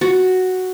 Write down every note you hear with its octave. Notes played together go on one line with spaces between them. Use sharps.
F#4